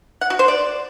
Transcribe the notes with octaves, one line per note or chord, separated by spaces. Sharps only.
F#5
F#4
C5
D5